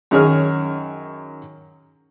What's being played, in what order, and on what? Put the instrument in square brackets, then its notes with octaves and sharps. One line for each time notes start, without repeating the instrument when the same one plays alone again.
[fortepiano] F#2 D#3 D#4 G#4 C#5 F6